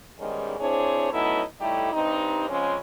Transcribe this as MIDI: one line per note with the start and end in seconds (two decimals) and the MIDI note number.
0.19 0.56 40
0.19 0.56 44
0.19 0.56 51
0.19 0.56 55
0.19 0.56 56
0.19 0.56 61
0.59 1.12 60
0.59 1.12 62
0.59 1.12 64
0.59 1.12 68
0.59 1.12 72
0.59 1.12 73
1.12 1.41 54
1.12 1.41 57
1.12 1.41 59
1.12 1.41 61
1.12 1.41 63
1.12 1.41 64
1.60 1.89 45
1.60 1.89 55
1.60 1.89 57
1.60 1.89 63
1.60 1.89 64
1.60 1.89 67
1.93 2.48 43
1.93 2.48 55
1.93 2.48 60
1.93 2.48 63
2.49 2.77 49
2.49 2.77 53
2.49 2.77 56
2.49 2.77 60
2.49 2.77 61